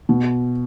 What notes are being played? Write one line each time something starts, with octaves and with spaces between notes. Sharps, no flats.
B2